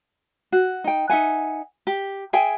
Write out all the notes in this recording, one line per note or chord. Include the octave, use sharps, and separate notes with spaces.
F#4
D#4 G5
D#4 E5 F#5 G#5
G4
G#4 E5 G5 G#5